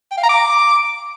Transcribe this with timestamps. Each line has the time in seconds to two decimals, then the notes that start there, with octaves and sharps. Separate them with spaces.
0.12 G5
0.18 F5
0.23 A#5
0.29 D6